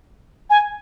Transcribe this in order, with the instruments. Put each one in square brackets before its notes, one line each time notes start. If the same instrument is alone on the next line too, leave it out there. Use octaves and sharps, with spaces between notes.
[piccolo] G#5